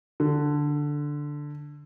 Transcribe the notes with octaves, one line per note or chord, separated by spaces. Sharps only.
D3